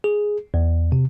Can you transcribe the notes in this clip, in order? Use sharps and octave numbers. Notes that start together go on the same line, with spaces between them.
G#4
E2
C3